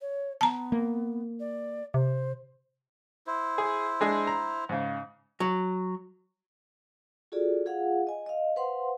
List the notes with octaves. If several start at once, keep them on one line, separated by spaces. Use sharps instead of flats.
C#5
B3 A5 A#5
A#3
D5
C3 C5
E4 C5
G#4
G#3 D4 G#4
A#5
G#2 C#3
F#3
F4 F#4 G#4 A4 D5
F4 G#4 F5 F#5
D#5 G#5
D#5 F5
B4 C5 F5 F#5 C6